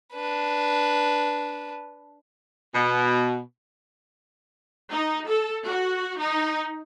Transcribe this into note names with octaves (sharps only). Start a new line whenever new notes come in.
D4 B4
B2
D#4
A4
F#4
D#4